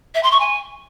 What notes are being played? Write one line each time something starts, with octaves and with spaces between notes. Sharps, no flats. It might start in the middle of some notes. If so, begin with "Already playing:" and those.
E5
C6
C#6
G#5